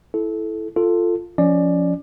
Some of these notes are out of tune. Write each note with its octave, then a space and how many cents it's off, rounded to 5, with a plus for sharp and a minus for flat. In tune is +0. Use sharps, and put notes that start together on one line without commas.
E4 +0 A4 -20
F4 +0 A4 +10
F3 +0 C#4 +20 D5 +20